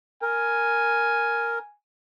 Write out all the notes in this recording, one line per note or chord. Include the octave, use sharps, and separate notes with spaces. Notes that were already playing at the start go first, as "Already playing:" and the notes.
A#4 G#5